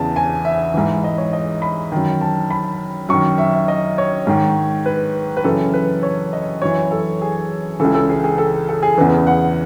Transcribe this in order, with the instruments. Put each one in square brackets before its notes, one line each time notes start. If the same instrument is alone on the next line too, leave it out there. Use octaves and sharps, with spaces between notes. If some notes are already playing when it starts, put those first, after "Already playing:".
Already playing: [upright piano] E2 C#3 E3 A5
G#5
E5
G#2 E3
D#5
C#5
D#5
B5
F#2 D#3
A5
B5
F#2 D#3 C#6
E5
E5
D#5
C#5
G#2 D#3
B4
B4
F#2 C#3 E3 A4
B4
C#5
D#5
F#2 E3 C#5
A4
G#4
C#2 C#3 E3 A4
A4
G#4
G#4
A4
A4
G#4
E2 C#3 E3 B4
F#5